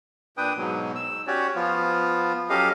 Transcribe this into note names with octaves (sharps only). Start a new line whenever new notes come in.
A#2 D4 B4 G5 D#6
G#2 B2 F#3
E6
C#4 F#4 G4 C#5 D5
F3 B3 F4
F#3 C#4 G4 A4 D#5 F5